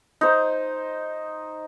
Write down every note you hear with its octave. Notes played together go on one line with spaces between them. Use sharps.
D#4 C5